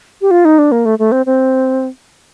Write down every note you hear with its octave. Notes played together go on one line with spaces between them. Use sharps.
G4
F4
D#4
D4
A#3
A3
A3
C4
C4